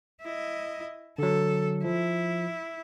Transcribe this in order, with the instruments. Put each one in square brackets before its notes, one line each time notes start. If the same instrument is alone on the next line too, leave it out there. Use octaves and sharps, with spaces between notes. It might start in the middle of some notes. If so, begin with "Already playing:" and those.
[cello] E4 D#5
[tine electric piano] D3 F#3 [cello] A4
[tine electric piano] F3 [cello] E4